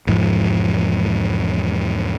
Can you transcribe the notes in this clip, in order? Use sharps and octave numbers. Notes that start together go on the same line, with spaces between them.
E1 G#2 F3